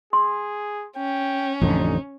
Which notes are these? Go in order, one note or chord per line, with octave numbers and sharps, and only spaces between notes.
G#4 C6
C#4 G5
A1 F2 D3 D#4